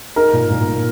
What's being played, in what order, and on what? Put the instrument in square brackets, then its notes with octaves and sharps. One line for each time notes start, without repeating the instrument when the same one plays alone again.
[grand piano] D#4 [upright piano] A#4
[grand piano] A#2
A#2
A#3